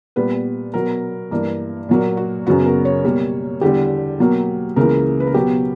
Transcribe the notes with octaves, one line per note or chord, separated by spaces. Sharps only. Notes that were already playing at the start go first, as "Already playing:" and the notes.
A#2 G3 B3 B4
B2 F#3 B3 A#4
G2 E3 A#3
A#2 F#3 A#3
F#4
F#2 C#3 F#3 B3 F#4
A#4
C#5
B2 G3 A#3
E2 D3 G3 G4
B2 F#3 A#3
C#2 C#3 E3 A#3 A#4
B4
A#4
B2 F#3 B3 G4